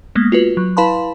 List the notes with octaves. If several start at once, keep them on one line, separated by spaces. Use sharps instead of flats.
G#3 A#3 B3
F4 F#4 B4
F#3
E4 B4 F5 A5 B5 C6